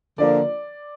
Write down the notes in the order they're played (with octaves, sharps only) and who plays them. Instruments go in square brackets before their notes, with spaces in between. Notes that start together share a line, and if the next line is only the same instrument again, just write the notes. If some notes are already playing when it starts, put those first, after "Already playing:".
[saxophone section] D3 F3 A#3 [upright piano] D5